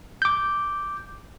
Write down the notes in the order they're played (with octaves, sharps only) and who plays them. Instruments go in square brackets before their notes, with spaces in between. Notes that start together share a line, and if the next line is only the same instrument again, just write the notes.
[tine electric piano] D6 G6